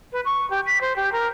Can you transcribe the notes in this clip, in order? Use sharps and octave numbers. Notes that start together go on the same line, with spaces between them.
B4
C#6
G4
B6
C5
G4
A#4